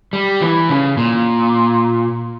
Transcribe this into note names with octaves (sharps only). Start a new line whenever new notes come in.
G3
E3
C#3
A#2